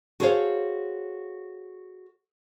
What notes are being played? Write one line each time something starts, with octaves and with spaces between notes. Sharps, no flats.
F#4 G#4 A4 C5 C#5 F5